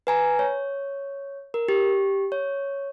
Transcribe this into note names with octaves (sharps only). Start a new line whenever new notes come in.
B4 G#5 A#5
C#5
A#4
G4
C#5